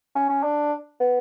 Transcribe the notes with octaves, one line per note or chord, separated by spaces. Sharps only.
C#4
C#4
D4
B3